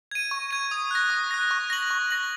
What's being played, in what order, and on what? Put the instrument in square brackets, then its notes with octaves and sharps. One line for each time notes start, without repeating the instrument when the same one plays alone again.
[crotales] G#6 D#7
C#6
G#6 D#7
D#6
F#6 A#6
D#6
F#6 A#6
C#6
A#6 F#7
C#6
A#6 F#7